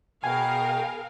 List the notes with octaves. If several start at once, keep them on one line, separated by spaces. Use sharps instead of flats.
B2 G#4 A#4 F5 G5 G#5